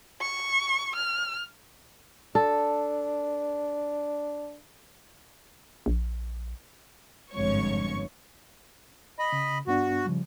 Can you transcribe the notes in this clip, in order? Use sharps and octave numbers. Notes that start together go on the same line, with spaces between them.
C#6
F6
D4 A4
A#1
G1 F2 G#2 F3 C#5 C#6
D#5 B5
C#3
G2 B3 D4 F#4
C#3 F3 G3